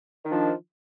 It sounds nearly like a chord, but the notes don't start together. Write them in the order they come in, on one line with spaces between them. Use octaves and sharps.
D#3 D4 F3